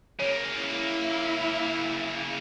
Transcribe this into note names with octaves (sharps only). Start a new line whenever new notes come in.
C#3 A#3 C#5
E4